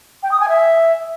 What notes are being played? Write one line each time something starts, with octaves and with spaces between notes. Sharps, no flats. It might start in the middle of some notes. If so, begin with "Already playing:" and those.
G5
D#6
G#5
E5